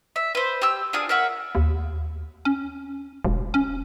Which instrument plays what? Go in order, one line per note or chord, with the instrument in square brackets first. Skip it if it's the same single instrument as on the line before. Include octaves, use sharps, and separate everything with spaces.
[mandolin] E5
B4 C5
G4 E6
D4 F4 G#4 D#6
A#4 C#5 E5 F#5
[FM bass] D#2
C#4
E1
C#4